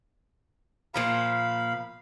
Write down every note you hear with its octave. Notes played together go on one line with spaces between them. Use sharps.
A#2 F3 F5 A#5 B5